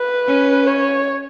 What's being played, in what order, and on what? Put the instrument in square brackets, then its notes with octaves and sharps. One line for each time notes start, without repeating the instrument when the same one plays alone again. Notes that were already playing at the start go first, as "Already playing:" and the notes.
Already playing: [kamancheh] B4
[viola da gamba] C#4
[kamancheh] C#5